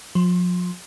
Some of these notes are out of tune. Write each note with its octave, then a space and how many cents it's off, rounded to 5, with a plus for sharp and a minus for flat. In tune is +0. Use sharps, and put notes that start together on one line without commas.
F3 +40 C6 +0